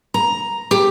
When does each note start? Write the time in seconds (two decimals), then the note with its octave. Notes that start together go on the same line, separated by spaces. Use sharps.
0.14 A#5
0.71 G4